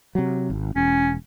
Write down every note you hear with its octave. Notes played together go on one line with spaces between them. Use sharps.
C3 F#3
G#1
E1 C#4